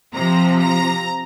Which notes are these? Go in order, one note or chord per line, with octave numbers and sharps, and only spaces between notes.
C3 F3 A#5
A#5